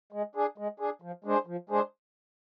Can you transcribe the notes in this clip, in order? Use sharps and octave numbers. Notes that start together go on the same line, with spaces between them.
G#3
D4 G#4
G#3
D4 G#4
F3
G#3 D4 G#4 C5
F3
G#3 D4 G#4 C5